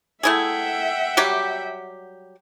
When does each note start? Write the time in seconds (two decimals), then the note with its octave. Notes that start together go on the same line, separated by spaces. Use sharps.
0.23 A3 E4 G#4 E5 F#5 G5
1.17 F#3 G3 G4